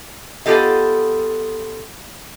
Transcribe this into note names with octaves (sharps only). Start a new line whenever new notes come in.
B3 F4 G4 A4 D#5